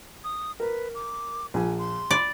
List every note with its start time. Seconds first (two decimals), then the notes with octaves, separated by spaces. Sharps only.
0.24 D#6
0.60 A#4 B4
0.95 D6
1.54 A#1 G#5
1.79 C6
2.11 D5 B5